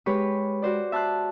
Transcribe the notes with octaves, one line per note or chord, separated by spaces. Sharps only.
G#3 G4 B4 C#5 B5 C#6
F#4 C5 D5
E5 A5 C6 F#6